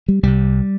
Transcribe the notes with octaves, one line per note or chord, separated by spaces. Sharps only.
G3
C2 C3 G3